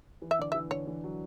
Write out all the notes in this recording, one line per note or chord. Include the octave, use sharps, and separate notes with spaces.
E3
E5
D3 D5
E3 E5
D3 C#5
E3
F#3